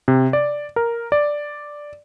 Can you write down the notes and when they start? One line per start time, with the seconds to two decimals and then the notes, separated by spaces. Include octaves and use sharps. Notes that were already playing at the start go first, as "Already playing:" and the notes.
0.08 C3
0.33 D5
0.76 A#4
1.12 D5